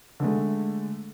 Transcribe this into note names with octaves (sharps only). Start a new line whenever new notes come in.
D3 G#3 A3